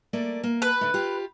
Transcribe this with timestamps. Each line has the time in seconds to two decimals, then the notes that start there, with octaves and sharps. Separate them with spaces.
0.13 A3 A#3 D5
0.43 A#3
0.62 B4
0.81 D3 A3
0.94 F4 G4